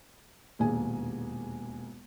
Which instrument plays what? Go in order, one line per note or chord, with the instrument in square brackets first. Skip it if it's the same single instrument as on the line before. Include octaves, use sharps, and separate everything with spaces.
[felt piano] E1 A#1 D#2 G#4 G#5